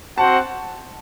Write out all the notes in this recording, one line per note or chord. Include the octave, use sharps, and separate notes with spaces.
C4 F#4 C5 F#5 A5